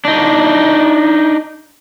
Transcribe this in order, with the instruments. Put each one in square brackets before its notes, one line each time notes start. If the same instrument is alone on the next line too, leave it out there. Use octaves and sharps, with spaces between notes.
[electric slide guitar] D4 D#4